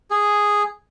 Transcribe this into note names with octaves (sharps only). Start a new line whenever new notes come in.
G#4